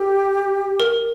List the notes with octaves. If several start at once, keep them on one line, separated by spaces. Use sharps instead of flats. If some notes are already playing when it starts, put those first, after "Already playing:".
Already playing: G4 A4
A#4